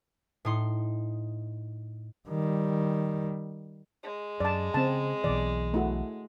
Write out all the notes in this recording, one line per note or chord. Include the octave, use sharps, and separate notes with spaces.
A2 D#4 C6
D#3 G3
G#3
F#2 D5 A5
C#3 C4 A5
B1 B2 E3 D5
A3 E4 F#4